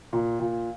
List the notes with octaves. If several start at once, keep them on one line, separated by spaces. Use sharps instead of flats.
A#2
A#2